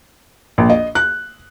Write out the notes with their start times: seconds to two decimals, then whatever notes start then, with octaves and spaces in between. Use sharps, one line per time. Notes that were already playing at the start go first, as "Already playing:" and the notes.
0.58 A#1
0.70 D#5
0.95 F#6